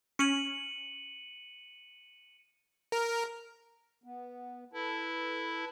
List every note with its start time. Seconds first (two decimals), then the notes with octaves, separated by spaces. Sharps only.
0.19 C#4 C#7 D#7 F#7
2.92 A#4
4.04 B3
4.73 E4 A4 B4 A5